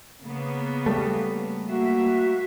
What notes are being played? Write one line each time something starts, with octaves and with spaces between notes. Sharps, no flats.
C#3 A#3 B3
G3 A3
A#3 F#4 E5